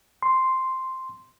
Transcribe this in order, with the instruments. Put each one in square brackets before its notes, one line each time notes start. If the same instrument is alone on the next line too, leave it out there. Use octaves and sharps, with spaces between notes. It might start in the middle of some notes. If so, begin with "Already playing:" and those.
[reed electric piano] C6